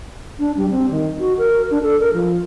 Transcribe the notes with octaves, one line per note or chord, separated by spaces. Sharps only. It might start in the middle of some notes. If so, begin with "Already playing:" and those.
D4
G3
C4
D#3
F#4
A#4
D4
A4
A#4
F3